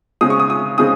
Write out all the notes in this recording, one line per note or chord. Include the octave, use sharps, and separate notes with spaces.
C#3 G#3 C4 D#6
C#6
D#6
D#6
C#3 G#3 C4 D#6